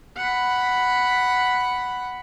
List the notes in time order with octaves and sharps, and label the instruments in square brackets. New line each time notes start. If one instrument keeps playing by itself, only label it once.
[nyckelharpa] F#5 B5